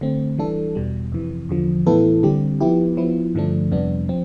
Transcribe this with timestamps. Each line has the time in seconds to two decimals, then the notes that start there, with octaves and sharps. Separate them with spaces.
0.01 D3 A3 C4
0.38 E3 G3 D4 A4
0.75 E2 B2 G3
1.12 F2 C3 E3
1.49 E2 D3 F3
1.86 A2 E3 B3 E4 A4
2.23 D3 G3 C4 G4
2.61 F3 B3 E4 G4
2.97 F3 B3 E4
3.35 G2 D3 F3 A3 D4
3.72 F2 C3 G3 B3 D4
4.09 F3 C4